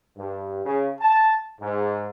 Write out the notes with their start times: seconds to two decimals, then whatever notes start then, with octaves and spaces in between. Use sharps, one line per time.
0.17 G2
0.65 C#3
1.01 A5
1.60 G#2